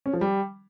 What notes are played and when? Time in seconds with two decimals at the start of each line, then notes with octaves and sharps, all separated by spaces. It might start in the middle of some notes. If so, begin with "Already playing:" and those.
0.06 C#4
0.13 F3
0.21 G3